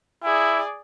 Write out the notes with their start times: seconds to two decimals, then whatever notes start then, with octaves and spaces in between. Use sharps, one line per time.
0.24 E4 G#4 D5